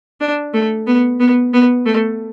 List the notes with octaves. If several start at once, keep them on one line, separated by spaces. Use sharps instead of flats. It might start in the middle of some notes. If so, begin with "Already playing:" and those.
D4
A3
B3
B3
B3
A3